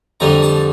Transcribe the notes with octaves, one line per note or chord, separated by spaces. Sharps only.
F2 D3 G3 A#5
A5